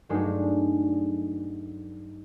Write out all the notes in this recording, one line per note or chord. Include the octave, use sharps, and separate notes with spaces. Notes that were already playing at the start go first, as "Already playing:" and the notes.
G2 F#3 G#3 A3 D4 D#4